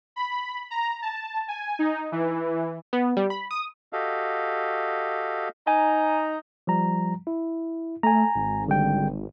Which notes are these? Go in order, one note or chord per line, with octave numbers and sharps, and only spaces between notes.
B5
A#5
A5
G#5
D#4
E3
B3
G3
B5
D#6
F#4 G4 A4 D#5 F5
D#4 G#5 A#5
F3 G3 A#5
E4
A3 G#5 A#5
G#1
D3 G3 G5